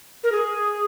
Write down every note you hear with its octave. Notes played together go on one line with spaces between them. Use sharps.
A#4
G#4